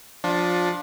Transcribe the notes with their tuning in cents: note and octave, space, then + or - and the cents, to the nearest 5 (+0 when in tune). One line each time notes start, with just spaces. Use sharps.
F3 +20 D4 +0 F4 +25